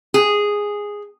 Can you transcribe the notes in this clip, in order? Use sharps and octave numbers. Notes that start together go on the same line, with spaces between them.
G#4